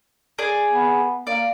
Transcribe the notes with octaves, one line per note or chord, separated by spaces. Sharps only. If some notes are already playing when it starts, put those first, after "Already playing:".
G#4 D5
B3
A#3 D5